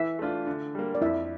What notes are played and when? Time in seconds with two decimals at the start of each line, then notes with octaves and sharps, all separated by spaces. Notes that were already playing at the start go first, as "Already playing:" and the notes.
Already playing: E3 E4 E5
0.19 A3 D4 F4
0.47 D3
0.75 G3 A#3
0.95 D5
1.01 F2 E4 E5